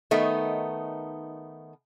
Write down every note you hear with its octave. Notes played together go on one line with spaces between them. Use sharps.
D#3 A3 B3 D#4